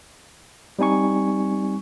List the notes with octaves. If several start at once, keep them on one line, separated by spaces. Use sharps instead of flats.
G3 C4 D#4 G#5 C#6